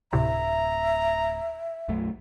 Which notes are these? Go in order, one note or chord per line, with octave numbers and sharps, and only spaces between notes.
D1 D2 A2 C3 E5 A#5
B1 F#2 A3